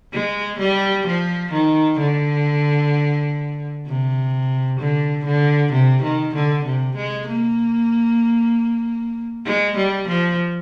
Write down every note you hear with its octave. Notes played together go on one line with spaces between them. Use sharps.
G#3
G3
F3
D#3
D3
C3
D3
D3
C3
D#3
D3
C3
G#3
A#3
G#3
G3
F3